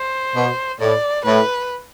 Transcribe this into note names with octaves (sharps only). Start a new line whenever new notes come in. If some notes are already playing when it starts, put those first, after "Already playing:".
Already playing: C5
B2
A2 D5
A2 B4